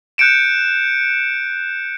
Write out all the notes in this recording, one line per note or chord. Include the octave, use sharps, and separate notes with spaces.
F#6 G6 C#7 D7 E7